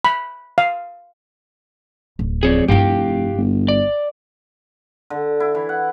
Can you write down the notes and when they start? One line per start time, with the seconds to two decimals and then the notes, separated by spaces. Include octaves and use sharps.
0.04 B5
0.58 F5
2.19 D1
2.43 F2 G#4 C#5 D5
2.68 F1 G2 E4 G4 F5 G5
3.37 G1
3.68 D5
5.10 D3
5.40 E4
5.55 E3
5.69 F#5